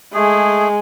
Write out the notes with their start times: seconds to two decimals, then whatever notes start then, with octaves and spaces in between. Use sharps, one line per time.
0.14 G#3 A3 G#4